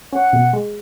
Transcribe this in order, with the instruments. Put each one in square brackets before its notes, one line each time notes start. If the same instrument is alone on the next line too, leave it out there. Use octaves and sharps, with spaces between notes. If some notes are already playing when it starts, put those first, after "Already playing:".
[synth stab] C#4 [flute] F#5
[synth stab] B2
G#3